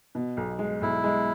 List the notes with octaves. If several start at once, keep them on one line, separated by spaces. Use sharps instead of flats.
B2
B1
G#3
B1 E4
G#3